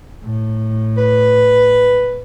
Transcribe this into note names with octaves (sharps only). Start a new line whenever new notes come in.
A2
B4